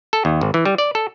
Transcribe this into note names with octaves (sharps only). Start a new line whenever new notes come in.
A4
D#2
G#1
E3
G3
D5
A4